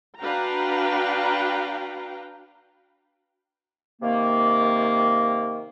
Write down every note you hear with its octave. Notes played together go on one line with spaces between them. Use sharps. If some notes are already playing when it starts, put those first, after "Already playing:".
D4 F#4 B4 F5 G5 A#5
C3 D#3 A#3